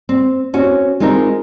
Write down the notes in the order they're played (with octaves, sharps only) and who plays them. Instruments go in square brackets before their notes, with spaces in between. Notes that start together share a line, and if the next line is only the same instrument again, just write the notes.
[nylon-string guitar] C4
C4 C#4 F#4
G#3 C4 D#4 F4 A#4